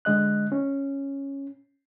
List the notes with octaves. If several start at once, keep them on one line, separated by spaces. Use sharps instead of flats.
D3 G#3 D#5 F#6
C#4